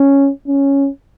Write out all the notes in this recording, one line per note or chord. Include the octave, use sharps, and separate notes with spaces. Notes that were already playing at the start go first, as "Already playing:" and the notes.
Already playing: C#4
C#4